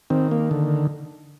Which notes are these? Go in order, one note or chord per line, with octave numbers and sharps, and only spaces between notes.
D#3 C4
A#3
D3